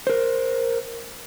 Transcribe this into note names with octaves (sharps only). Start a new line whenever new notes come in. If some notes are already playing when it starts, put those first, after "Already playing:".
A#4 C5